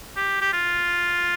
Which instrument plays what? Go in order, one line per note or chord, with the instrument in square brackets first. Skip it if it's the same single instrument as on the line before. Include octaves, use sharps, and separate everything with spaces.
[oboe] G4
G4
F4